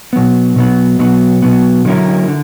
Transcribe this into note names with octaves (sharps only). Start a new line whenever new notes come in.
B2 F#3 B3
B2 F#3 B3
B2 F#3 B3
B2 F#3 B3
D3 F#3 C#4 E4 A#4
D3